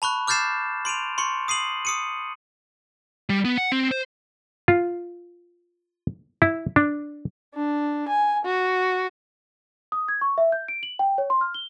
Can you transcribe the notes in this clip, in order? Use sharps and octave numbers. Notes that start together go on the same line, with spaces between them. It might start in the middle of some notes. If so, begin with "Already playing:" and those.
A5 B5 C#6 F#6
D6 F6 G6 A6 C7 E7
C6 D7 D#7 F7
C6 C#6 C#7
D#6 C7 D#7 F#7
D#6 C#7 D#7
G3
B3
F#5
C4
C5
F4
E4
D4
D4
G#5
F#4
D#6
G#6
C#6
E5
G6
D7
F#7
G5
C#5
C6
F6
G7